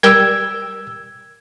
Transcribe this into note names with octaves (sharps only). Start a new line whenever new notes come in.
G3 A#4 G5 E6 G#6